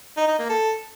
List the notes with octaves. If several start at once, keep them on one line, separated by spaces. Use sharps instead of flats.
D#4
D#4
A#3
A4